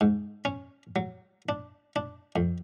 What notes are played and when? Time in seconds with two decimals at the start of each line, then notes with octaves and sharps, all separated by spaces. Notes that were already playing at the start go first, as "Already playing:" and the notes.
0.01 G#2
0.45 C#4
0.96 F#3
1.49 D4
1.96 D4
2.36 F2